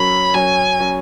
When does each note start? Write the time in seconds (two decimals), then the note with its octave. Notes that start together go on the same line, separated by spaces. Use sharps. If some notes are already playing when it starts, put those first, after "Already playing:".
Already playing: F#2 F#3 C#4 B5
0.34 F#2 F#3 C#4 G#5
0.79 F#3 C#4